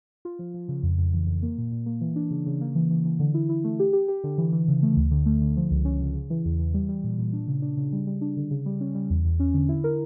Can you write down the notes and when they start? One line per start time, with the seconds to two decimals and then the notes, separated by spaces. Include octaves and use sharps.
0.25 F4
0.39 F3
0.54 F3
0.68 C#3
0.83 F2
0.98 F2
1.14 E3
1.27 F2
1.42 A#3
1.58 A#2
1.72 A#2
1.86 A#3
2.01 E3
2.16 D4
2.31 C#3
2.46 C#3
2.61 A#3
2.75 E3
2.91 E3
3.05 E3
3.19 D3
3.34 E4
3.49 E4
3.64 A3
3.79 G4
3.93 G4
4.08 G4
4.24 D3
4.38 E3
4.53 E3
4.68 C#3
4.83 A3
4.96 D2
5.11 D3
5.26 A3
5.41 D3
5.57 F3
5.71 C#2
5.85 C#4
6.01 C#3
6.15 C#3
6.30 E3
6.45 E2
6.59 E3
6.74 G3
6.89 G3
7.04 A#2
7.18 A#2
7.33 D4
7.47 C#3
7.62 D4
7.77 C#3
7.92 G3
8.07 G3
8.21 D4
8.37 D3
8.51 C#3
8.66 G3
8.81 C#4
8.95 G3
9.10 E2
9.25 E2
9.40 C#4
9.54 D3
9.69 E4
9.84 A#4